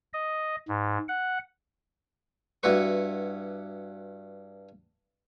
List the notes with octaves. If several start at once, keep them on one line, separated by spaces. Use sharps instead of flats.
D#5
G#2
F#5
G2 E4 F#4 B4 C#6